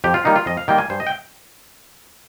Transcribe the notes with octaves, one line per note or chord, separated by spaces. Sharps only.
F2 G4
F4
D#3 G3 A#3 D#4
F4
F2 D#5
F5
D#3 G3 A#3 G5
G#5
G2 C5
D#5
G5